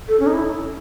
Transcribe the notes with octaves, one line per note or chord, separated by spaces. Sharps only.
A4
C#4
D#4
E4